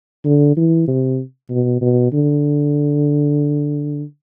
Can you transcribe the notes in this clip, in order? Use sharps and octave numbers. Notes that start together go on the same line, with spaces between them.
D3
E3
C3
B2
B2
D3